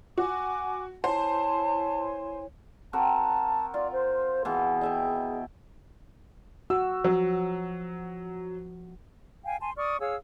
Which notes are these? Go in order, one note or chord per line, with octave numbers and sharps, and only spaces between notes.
F#4 G#5 D6
E4 C5 C#5 G#5 A5
C4 F#4 A#4 A5
F4 D5
C5
B2 E3 G#4
D#5 E5 G5
F#4 E6
F3 F#3
F5 G5 G#5
G#5 A5 C6
D5 C#6 D#6 F6
G#4 C#5 F5 E6